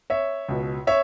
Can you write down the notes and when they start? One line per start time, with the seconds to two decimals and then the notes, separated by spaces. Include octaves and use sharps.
0.10 C#5 E5
0.49 C#2 B2
0.87 C#5 E5